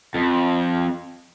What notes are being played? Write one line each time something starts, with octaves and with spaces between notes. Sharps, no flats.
F2